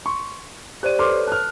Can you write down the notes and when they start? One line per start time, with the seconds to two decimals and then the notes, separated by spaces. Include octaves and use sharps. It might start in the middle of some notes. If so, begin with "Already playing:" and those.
0.06 C6 C#6
0.83 G4 C5 D5 F#6 D#7
0.99 A4 B4 C#5 C6 D6 F6
1.27 A5 F6 F#6